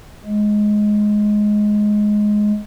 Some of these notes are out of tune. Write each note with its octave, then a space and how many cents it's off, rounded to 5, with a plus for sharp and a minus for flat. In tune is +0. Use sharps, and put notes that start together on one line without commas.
G#3 +10